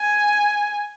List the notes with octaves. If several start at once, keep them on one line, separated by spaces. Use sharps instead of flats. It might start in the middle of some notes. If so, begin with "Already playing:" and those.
Already playing: G#5